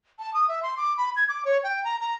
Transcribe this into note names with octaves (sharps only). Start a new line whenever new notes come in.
A5
D#6
E5
C6
D6
B5
G#6
D6
C#5
G5
A#5
A#5